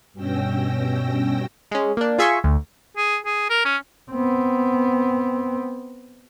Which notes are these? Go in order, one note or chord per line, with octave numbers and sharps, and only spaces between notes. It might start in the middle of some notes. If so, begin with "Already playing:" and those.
G2 B2 C#4 G5 E6 A#6
G#3 C#4
A#3 D4
F4 G#4 E5 G#5 C6 C#6
D2
G#4
G#4
A#4
C#4
B3 C4